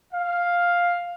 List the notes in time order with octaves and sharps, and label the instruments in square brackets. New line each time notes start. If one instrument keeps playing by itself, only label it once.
[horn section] F5